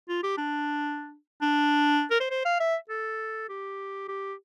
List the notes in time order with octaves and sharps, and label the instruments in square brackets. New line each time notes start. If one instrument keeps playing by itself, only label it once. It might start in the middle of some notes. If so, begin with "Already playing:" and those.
[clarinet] F4
G4
D4
D4
A#4
C5
C5
F5
E5
A4
G4
G4